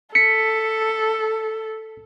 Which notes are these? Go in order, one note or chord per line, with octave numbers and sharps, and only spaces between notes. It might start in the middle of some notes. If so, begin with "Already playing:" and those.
A4 B6 C#7